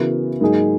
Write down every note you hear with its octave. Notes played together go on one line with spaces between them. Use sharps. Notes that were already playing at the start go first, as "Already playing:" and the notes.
Already playing: C#3 E3 B3 F#4 A#4
G#2 F#3 A#3 D#4 G#4